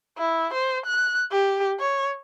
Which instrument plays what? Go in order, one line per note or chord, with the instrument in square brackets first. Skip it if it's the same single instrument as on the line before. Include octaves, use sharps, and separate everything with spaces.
[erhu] E4
C5
F#6
G4
C#5